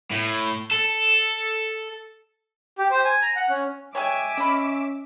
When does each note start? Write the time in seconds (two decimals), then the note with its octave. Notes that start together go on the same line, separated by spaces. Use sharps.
0.11 A2
0.71 A4
2.78 G4
2.91 C5
3.05 G#5
3.22 A#5
3.36 F#5
3.50 C#4
3.95 G#3 G4 C#5 E5 G#5 D6
4.37 C#4 D#5 B5